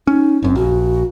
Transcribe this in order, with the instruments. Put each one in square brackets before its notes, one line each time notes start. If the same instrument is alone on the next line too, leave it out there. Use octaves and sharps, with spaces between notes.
[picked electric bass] C#4 [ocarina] D#4
[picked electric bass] F#1 F#2 [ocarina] C4
[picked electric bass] A#1 [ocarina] F#4